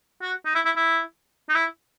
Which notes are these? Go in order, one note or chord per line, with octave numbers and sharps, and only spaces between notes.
F#4
D#4
E4
E4
E4
D#4
E4